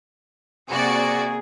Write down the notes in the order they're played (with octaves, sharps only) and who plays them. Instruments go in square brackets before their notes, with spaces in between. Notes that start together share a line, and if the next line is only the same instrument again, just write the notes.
[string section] C3 F#4 D5 [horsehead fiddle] A#3 G#4